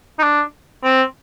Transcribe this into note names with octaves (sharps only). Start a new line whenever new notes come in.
D#4
D4
C4